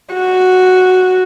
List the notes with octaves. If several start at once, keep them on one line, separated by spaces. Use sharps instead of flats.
F#4